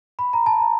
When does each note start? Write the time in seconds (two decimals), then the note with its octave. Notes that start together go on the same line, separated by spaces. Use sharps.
0.19 B5
0.33 A#5
0.46 A5
0.60 A#5